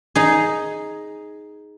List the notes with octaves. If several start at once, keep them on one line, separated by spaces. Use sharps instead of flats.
D#4 G#4